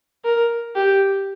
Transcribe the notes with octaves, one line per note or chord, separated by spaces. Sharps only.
A#4
G4